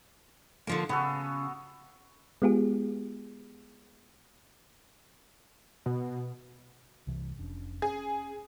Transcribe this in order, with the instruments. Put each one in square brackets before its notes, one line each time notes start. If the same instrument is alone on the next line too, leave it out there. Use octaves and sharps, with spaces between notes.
[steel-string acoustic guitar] D3 F3 A#3
[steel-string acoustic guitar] C#3 [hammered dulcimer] B3 F#4 A4
[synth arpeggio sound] G#3 B3 F4 G4 G#4
[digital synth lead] B2
[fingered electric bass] C2 C3 E3
F1 C#4 D4
[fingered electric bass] C#4 [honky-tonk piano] G#4